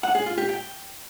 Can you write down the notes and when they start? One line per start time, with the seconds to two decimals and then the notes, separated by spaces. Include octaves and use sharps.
0.03 F#5
0.15 G#4
0.26 F4
0.38 G4
0.49 G5